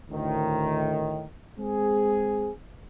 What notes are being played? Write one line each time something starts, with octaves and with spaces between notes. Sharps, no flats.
D2 A2 D#3
G#3 C4 G#4